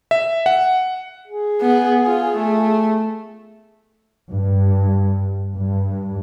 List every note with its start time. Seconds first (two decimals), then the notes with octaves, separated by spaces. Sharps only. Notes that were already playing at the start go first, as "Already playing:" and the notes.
0.11 E5
0.46 F#5
1.27 G#4
1.61 B3
2.07 F4
2.37 A3
4.34 G2
5.57 G2